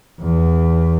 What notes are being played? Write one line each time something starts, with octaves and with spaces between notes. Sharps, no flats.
E2